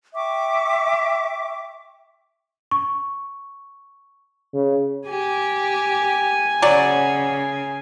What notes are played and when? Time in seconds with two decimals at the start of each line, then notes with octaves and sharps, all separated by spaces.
0.15 E5 G5 C#6 D6
2.71 C#6
4.54 C#3
5.09 G4 G#5
6.62 C#3 F#3 D5